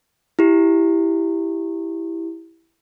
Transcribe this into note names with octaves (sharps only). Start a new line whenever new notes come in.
E4 G4